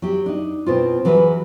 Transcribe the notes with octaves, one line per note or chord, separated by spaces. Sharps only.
F#3 G4
D4 D#4
B2 C4 F4
E3 F#3 G#4 A#4 B4